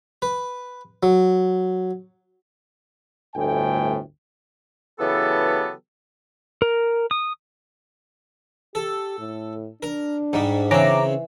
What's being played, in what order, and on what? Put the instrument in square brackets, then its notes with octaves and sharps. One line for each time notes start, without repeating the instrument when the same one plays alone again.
[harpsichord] B4
F#3
[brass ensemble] G1 D2 A2 G5 G#5
[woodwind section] C#3 E3 F#3 B3 G4 A4
[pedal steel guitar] A#4
D#6
[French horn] G4 [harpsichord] A4
[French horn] A2
[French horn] D4 [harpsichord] A#4
[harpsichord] G#2 G3 [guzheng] D#4
[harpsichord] C#3 C4 [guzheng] E3 [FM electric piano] C#4 A#5 D6